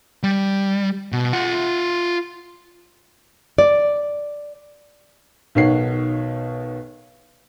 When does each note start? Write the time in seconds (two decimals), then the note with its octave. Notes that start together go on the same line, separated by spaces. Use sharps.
0.23 G3
1.13 B2
1.33 F4 F#5
3.58 D5
5.55 B1 B2 D#3 C#5 F#5 C7